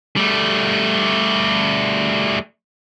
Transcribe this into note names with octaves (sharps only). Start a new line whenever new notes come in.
G3 A3